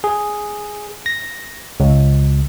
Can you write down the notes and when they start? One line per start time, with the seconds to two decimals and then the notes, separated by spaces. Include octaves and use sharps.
0.04 G#4
1.06 A#6
1.80 C#2